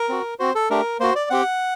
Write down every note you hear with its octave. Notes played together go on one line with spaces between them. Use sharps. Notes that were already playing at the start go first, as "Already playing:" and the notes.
Already playing: A#4
C4 F#4
C4 F#4 C5
A4
A3 D4 G4 A#4
A#3 F#4 C5
D5
C4 G4 F#5